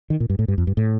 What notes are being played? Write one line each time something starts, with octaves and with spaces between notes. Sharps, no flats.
D#3
A#2
G2
A2
G2
F2
G2
A2